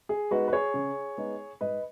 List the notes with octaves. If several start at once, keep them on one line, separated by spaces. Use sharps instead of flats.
G#4
G#3 B3 D#4 F#4 B4
B4
G#4 C#5
C#3
G#3 B3 D#4
G#2 B4 D#5